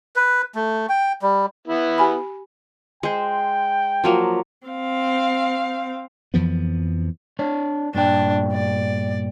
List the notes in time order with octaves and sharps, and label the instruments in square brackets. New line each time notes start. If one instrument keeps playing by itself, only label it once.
[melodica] B4
A3
G5
G3
[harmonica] B3 E4
[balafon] G4 G#5 B5
[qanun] G#3 C5 [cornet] G5
[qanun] F3 F#3 A#3
[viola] C4 F5
[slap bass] F2 E3 F3 B3
[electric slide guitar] D4 C#5 D5
[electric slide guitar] G2 A#2 G5 [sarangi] D4
[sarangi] D5